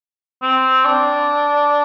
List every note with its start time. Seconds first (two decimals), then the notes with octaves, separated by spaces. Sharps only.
0.42 C4
0.85 D4